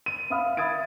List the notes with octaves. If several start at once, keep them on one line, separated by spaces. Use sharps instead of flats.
D#7
E5 F5 B5 D#6 F6
E5 B5 D#6 G#6 A6 D7